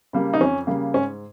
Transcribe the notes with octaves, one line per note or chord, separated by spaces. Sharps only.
C#3 G3 A#3
D#4
F2 C#4
C#3 G3 A#3
G#2 C#4